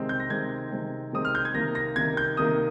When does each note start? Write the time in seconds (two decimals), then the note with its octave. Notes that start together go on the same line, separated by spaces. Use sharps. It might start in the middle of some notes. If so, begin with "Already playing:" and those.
Already playing: C3 D#3 G#3 C4
0.09 G6
0.20 A#6
0.30 C3 D#3 G#3 C4 G#6
0.71 C3 D#3 G#3 C4
1.12 C3 D#3 G#3 C4 D#6
1.25 F6
1.35 G6
1.45 G#6
1.54 C3 D#3 A#3 A#6
1.75 A#6
1.96 C3 D#3 A#3 G#6
2.17 G6
2.37 C3 D#3 A#3 D#6